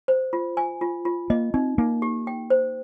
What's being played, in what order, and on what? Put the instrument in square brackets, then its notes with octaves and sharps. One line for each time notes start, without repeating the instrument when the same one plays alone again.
[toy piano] C5
F4
G#5
F4
F4
[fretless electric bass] A#3 [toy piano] D#5
[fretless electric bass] C4 [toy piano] D#4
[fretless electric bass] A#3 [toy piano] D#4
[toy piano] G4
G5
C5